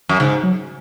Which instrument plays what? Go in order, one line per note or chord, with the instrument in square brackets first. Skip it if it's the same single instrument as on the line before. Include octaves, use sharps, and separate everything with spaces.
[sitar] F#2
[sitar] G#2 [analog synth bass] C#3
[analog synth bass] F#3